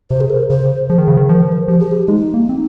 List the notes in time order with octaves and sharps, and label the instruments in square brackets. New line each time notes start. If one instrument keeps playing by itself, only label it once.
[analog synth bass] C3 [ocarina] C5
[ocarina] G#4
A#4
[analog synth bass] C#3 [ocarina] C5
[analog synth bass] F3 [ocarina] G#4
[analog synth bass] D#3
C#3
D#3
[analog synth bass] F3 [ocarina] A#4
[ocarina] C5
A#4
[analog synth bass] F3 [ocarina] G4
[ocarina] G#4
G4
[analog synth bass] G#3 [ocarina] D#4
[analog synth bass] A#3
C4